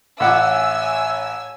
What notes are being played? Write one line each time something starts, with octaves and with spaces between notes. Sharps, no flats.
A1 C#5 E5 F#5 G#5 D6 E6